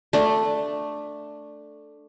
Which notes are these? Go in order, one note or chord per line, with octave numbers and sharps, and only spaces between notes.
A3 D4